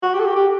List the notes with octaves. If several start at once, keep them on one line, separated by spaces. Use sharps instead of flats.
F#4
G4
A4
G4
G4